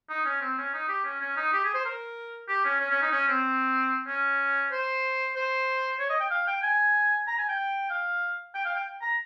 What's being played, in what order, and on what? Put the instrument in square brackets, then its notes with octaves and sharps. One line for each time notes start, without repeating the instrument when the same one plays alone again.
[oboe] D#4
C#4
C4
C#4
D#4
G4
C#4
C#4
D#4
G4
G#4
C5
A#4
G4
C#4
C#4
C#4
D#4
C#4
C4
C#4
C5
C5
C#5
D#5
G5
F5
G5
G#5
A#5
G#5
G5
F5
G5
F5
G5
A#5